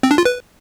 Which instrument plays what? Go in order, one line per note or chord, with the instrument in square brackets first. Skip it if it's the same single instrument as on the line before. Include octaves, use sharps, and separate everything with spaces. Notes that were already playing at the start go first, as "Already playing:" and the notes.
[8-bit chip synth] C4
D4
F4
B4